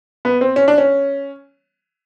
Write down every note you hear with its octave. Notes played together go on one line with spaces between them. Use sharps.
B3
C4
C#4
D4
C#4